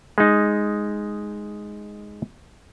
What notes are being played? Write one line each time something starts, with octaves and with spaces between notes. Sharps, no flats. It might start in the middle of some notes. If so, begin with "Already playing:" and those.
G#3 D#4